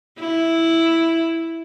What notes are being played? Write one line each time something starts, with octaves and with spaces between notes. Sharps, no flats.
E4